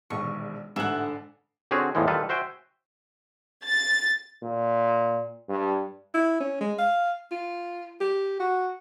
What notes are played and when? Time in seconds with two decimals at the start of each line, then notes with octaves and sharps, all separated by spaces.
0.10 E1 A#1 D#2 C#6
0.76 A1 G#2 D3 E5 F#5 E7 F#7
1.71 D3 C4 C#4 F#4 G#4 C#5
1.95 E2 A2 E3 F3 G#3
2.08 D#3 G3 F4 A4 B4
2.29 F#4 C5 E5 G5 G#5
3.67 A6
4.43 A#2
5.49 G2
6.14 E4
6.40 C#4
6.61 G#3
6.79 F5
7.32 F4
8.01 G4
8.40 F#4